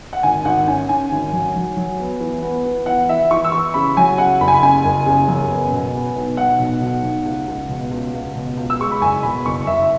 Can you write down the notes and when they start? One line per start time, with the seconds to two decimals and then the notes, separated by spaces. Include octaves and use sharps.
0.13 F#5
0.23 G#1 G#5
0.45 G#1 F#5
0.67 C#4 G#5
0.89 C#4 G#5
1.12 G#1
1.33 F#3
1.56 F#3
1.77 F#3
2.00 B3
2.20 E3
2.42 B3
2.65 B3
2.86 E3 F#5
3.09 E3 E5
3.31 E3 C#6
3.44 E6
3.52 E3 C#6
3.74 C#3 B5
3.97 F#3 G#5
4.18 C#3 F#5
4.40 F#1 B5
4.48 G#5
4.54 B5
4.62 C#3 G#5
4.85 F#1
5.06 C#3
5.28 F#2
5.50 B3
5.72 B2
5.95 B3
6.15 B1
6.37 B1 F#5
6.60 B2
6.81 B1
7.03 B1
7.25 C#2
7.47 C#2
7.69 B2
7.91 C#2
8.13 C#2
8.35 B2
8.57 C#2
8.70 E6
8.79 G#3 C#6
8.92 B5
9.01 F#1 G#5
9.23 B2 B5
9.45 F#1 C#6
9.67 F#1 E5